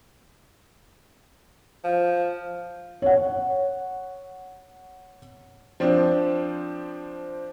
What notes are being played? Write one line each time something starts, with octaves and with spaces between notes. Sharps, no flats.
F3
C#5 F#5
F3 C4 D4